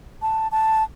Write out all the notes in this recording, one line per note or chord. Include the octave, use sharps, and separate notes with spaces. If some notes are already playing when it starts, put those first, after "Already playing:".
A5
A5